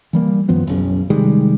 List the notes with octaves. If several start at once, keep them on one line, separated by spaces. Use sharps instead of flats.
E3 G3 A#3
F#2 D#3 F3 B3
F#1 B1 F#2 C#3
C3 D#3 G3 G#3